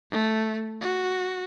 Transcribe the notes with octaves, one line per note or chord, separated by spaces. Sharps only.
A3
F#4